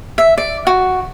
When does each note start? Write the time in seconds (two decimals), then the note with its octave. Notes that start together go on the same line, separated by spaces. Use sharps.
0.18 E5
0.38 D5
0.67 F#4